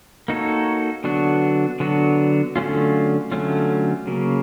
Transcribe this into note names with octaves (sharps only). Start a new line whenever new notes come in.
A#3 D#4 F#4 A4 C#5
D3 F#3 B3 D4 F#4
D3 F#3 B3 D4 F#4
D3 F#3 A3 C#4 F4
D3 F#3 A3 C#4 F4
C#3 F#3 A#3